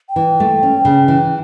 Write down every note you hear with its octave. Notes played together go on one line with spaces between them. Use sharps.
G5
E3
A3
C#4
C#3
E3